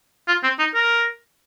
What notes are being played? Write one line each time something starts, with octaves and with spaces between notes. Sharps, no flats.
F4
C4
D#4
A#4